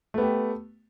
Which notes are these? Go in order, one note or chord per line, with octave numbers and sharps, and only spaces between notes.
A3 B3 G4